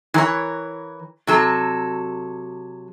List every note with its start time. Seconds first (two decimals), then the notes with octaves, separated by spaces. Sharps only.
0.14 E3 A#4 C#5
1.27 C3 F#3 A4